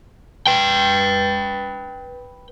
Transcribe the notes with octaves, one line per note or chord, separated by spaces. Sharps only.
B4 G5